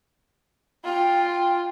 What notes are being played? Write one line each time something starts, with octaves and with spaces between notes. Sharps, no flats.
F4 G5